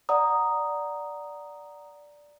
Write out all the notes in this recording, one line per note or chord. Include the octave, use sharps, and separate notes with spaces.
D5 F#5 A#5 D#6